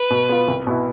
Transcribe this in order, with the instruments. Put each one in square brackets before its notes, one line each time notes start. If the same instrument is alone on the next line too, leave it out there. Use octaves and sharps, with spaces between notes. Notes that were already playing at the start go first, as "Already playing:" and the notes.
Already playing: [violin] B4
[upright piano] B2
B3 F4
C2
B2 B3 E4